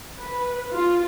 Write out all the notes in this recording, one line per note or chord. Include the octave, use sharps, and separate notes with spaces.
B4
F4